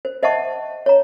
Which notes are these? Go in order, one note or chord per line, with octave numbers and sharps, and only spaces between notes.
C5
C5 D#5 E5 F#5 A5 C#6
C#5 A#5